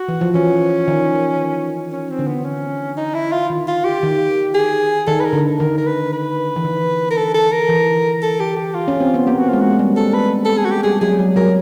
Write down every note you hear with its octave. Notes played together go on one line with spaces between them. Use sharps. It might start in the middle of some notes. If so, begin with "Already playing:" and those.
Already playing: F#4
E3
F3
E3 C#4
D#3
C#4
C4
D3
B3
C#4
D#4
E4
F4
D#3
F4
G4
D#3
G#4
D#3 A4
B4
A#4
D3
D#3 A#4
A#4
B4
B4
E3
D#3
A#4
A4
A4
A#4
E3
A4
G4
G4
F4
C#4
C4
B3
A#3 G4
F#4
G#3 F4
F#4
G3
A4
B4
A4
G#4
F#4
G4
G3 G#4
F#3 G#4
F#3
F#3 A#4